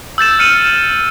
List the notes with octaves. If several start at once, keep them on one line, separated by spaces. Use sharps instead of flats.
E6 G6 A6 E7
F6 C#7 D#7 E7 F#7